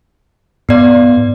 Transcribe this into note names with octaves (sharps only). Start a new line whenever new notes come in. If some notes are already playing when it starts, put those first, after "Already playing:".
G#2 B3 D5